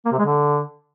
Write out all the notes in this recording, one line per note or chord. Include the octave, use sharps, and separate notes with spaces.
A#3
C3
G#3
D3